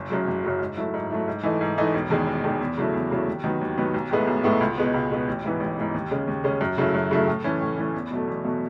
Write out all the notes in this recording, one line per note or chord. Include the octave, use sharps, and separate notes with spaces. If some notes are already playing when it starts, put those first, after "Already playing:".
Already playing: F#1
F#2 C#3 F#3
F#1
F#2 C#3 F#3
G#2
F#3 A3 E4
G#2
F#3 A3 E4
G#2
E3 A3 D#4
G#2
E3 A3 D#4
E1
E2 D#3 G#3
E1
E2 D#3 G#3
E2
C#3 F#3 A3 E4
E2
C#3 F#3 A3 E4
D#2
D#3 F#3 B3
D#2
D#3 F#3 B3
B1
A2 G#3 B3 E4
B1
A2 G#3 B3 E4
C#2
B2 G#3 B3
C#2
B2 G#3 B3
A1
G#2 E3 B3
A1
G#2 E3 B3
D#2
C#3 G#3 C#4
D#2
C#3 G#3 C#4
F#2
C#3 F#3 A3 E4
F#2
C#3 F#3 A3 E4
A2
E3 A3 C#4
A2
E3 A3 C#4
E2
B2 F#3 A3
E2
B2 F#3 A3